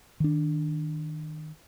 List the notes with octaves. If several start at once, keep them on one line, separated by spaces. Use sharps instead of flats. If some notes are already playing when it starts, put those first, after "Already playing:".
D#3 D4